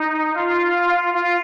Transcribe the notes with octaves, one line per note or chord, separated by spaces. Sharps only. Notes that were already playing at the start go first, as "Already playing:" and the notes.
Already playing: D#4
F4
F4